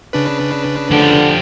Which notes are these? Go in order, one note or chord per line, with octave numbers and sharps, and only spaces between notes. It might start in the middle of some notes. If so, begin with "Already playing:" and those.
C#3 D4 B4
D3 F3 G4